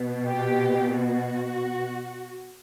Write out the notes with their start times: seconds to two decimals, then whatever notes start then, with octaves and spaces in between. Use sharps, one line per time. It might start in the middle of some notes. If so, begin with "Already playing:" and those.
Already playing: B2
0.26 G4
0.99 F#4